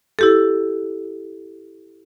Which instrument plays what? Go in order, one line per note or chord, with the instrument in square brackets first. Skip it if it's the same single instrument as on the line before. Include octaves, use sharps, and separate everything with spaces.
[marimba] E4 G4 A4